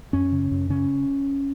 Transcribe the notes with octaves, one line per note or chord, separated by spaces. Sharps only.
F#2 C#4
C#3
F#2
C#3 C#4